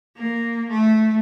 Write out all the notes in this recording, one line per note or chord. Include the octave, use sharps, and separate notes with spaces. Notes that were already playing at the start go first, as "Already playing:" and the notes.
A#3
A3